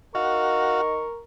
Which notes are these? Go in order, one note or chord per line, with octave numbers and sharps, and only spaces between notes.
D#4 F#4 A#4 F5 C#6